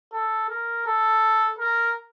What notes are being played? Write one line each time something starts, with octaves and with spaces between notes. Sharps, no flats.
A4
A#4
A4
A#4